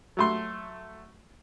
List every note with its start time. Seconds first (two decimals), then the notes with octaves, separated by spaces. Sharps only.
0.17 F#3 A3 C6